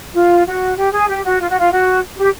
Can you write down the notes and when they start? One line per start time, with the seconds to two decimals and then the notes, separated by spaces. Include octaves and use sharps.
0.15 F4
0.47 F#4
0.77 G4
0.93 G#4
1.09 G4
1.24 F#4
1.40 F4
1.50 F#4
1.59 F4
1.71 F#4
2.17 G4